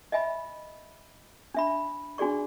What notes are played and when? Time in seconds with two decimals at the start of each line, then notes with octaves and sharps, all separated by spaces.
0.12 D#5 E5 G#5 B5
1.54 D4 E5 B5
2.18 D4 F#4 G#4 D5 C#6